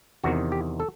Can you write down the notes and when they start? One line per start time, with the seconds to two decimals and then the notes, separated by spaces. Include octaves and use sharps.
0.24 E2 C3 D#3 F#4
0.52 G4
0.80 A4